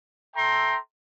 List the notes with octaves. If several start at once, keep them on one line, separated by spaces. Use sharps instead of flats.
A4 E5 G5 A#5 C6